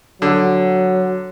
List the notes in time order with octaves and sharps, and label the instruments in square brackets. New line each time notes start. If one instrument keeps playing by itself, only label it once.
[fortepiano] D3 [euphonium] F#3